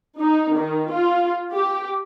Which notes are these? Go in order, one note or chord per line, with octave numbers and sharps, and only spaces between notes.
D#4
D#3
F4
G4